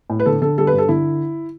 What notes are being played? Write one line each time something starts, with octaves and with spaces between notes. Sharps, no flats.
A2
B4
D3 A4
D3 A4
G3 A4
B4
G2
A4
D3 E4